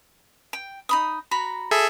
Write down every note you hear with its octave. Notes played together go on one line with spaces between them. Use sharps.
G5
D#4 B5 D#6
F#4 A#5 B5
G#4 A4 E5